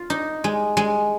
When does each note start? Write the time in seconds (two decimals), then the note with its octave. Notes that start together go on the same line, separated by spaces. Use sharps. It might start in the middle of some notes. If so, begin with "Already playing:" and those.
Already playing: F4
0.10 D#4
0.44 G#3
0.77 G#3